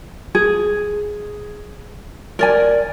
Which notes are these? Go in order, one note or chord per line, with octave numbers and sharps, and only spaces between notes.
G#4
A#4 D5 G#5